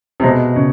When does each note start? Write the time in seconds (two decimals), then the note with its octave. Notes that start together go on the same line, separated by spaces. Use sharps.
0.20 C3
0.23 B2 G#3
0.56 C#3